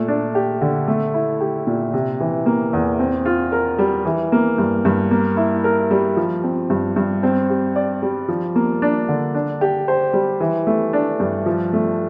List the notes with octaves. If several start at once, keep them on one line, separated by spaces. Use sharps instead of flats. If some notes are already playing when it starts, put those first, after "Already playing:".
Already playing: A#2 A3
D4
G4
D3
A3
E4
G4
A#2
C3
E3
A#3
E2
C4
F4
A#4
G3
E3
A#3
G2
G2
A#3
E4
A#4
G3
F3
C4
G2
G2
C4
G4
D5
G3
F3
A#3
D4
D3
D4
G4
C5
G3
E3
A3
D4
G2
F3
A3